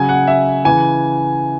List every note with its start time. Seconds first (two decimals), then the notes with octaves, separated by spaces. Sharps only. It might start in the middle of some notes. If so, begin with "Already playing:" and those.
Already playing: C#3 F#3 G#5
0.09 F#5
0.27 E5
0.64 C#3 E3 G#5